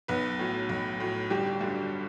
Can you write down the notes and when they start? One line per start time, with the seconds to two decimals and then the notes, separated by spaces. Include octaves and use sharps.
0.08 B1 B3 B4
0.39 A2 F#3
0.69 B1
1.00 A2 F#3
1.30 G1 G3 G4
1.61 G2 D3 F#3